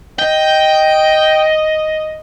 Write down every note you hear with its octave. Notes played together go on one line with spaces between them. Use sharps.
D#5 G5